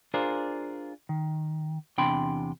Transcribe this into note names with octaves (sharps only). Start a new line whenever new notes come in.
D4 F4 G#4 A#4 C5 D5
D#3
E2 C3 D4 G5 B5 C6